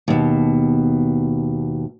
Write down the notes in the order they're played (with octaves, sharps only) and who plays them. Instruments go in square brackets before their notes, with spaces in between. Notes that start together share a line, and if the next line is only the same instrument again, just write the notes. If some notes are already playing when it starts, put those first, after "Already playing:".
[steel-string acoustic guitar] D#2 B2